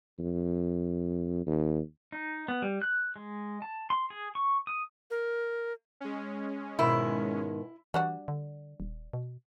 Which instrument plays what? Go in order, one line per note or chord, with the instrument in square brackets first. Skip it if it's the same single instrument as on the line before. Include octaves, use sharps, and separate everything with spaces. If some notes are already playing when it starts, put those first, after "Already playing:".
[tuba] F2
D#2
[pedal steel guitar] D#4
B3
G3
F#6
G#3
A5
C6
G#4
C#6
D#6
[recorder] A#4
[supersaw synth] G#3 C#4
[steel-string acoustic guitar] G#2 B2 D#3 [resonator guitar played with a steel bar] E4
[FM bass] E3 [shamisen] G3 D4 F#4
[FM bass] D3
D#1
B2